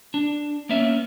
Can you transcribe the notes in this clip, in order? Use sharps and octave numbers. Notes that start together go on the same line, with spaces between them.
D4
A#3 B3 C#4 E5